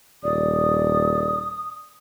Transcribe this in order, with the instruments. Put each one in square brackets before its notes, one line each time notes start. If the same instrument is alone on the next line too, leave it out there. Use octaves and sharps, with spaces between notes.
[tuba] D#1 [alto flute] D5 [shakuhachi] D#6